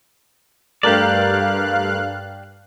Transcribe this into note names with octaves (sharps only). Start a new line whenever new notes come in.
G2 A3 G4 A#4 D5 F5 F#6 F#7